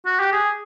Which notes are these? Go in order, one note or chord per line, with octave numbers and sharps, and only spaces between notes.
F#4
G4
G#4